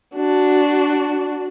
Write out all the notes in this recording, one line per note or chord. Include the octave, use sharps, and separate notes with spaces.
D4 F#4